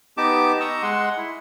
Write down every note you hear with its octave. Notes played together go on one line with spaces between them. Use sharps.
B3 D#4 G4 A5 D6
D#5 A#5 C#6 D#6 E6
G#3 F#5 C6
E4